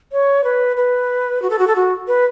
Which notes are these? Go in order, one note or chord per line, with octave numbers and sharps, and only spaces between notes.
C#5
B4
B4
F#4
A4
F#4
A4
F#4
B4